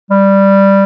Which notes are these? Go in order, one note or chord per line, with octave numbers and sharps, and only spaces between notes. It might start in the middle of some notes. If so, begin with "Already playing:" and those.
G3